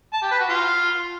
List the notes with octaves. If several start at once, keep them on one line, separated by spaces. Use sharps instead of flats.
A5
G4
B4
F#4
F4